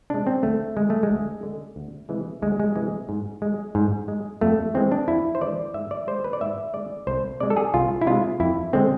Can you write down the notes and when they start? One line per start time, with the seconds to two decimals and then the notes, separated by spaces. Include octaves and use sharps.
0.10 C3 G#3 D4
0.27 C4
0.43 D2 A3
0.76 D3 G#3
0.90 A3
1.03 G#3
1.10 D2
1.43 D3 G#3
1.76 D2
2.09 C3 E3 G#3
2.42 D2 G#3
2.60 G#3
2.76 C3 E3 G#3
3.09 G#2
3.42 G#3
3.75 G#2
4.08 G#3
4.41 F2 A3
4.74 E3 G#3 C4
4.92 D4
5.08 F2 E4
5.35 C5
5.41 E3 G#3 D5
5.74 G#2 E5
5.91 D5
6.07 G#3 C5
6.24 B4
6.33 D5
6.41 G#2 E5
6.74 G#3 D5
7.07 C2 C5
7.40 C3 G#3 D5
7.50 A4
7.57 G#4
7.74 C2 F4
8.02 E4
8.06 C3 G#3 F4
8.40 F2 E4
8.73 D3 G#3 C4